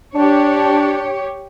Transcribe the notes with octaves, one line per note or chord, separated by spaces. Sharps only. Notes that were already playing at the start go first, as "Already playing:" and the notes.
D4 G4 C#5